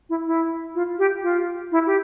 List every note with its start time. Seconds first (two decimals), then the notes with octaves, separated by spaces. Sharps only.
0.09 E4
0.26 E4
0.75 F4
0.99 G4
1.23 F4
1.72 E4
1.87 G4